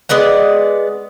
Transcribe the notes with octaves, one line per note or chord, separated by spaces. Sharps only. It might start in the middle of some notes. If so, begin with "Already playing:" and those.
G#3 B3 D5 F#5